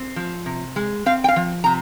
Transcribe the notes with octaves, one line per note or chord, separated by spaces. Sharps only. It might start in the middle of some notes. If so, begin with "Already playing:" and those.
Already playing: C4
F3
C3
G#3
C4 F5
G5
F5
F3
C3 A#5